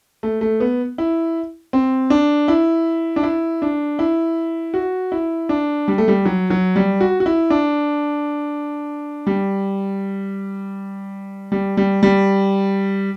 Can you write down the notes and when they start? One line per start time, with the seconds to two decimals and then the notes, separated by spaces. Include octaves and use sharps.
0.23 A3
0.41 A3
0.60 B3
0.98 E4
1.73 C4
2.10 D4
2.48 E4
3.16 D4
3.23 E4
3.62 D4
3.99 E4
4.74 F#4
5.12 E4
5.49 D4
5.88 G3
5.98 A3
6.08 G3
6.25 F#3
6.50 F#3
6.76 G3
7.01 F#4
7.20 F#4
7.26 E4
7.50 D4
9.27 G3
11.52 G3
11.77 G3
12.03 G3